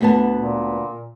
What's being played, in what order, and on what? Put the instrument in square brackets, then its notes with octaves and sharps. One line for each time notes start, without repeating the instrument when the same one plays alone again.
[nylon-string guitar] D2 B3 A5
[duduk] A#2